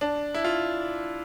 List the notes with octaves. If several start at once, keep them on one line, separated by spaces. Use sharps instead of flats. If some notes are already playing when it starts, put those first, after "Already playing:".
D4
E4
F4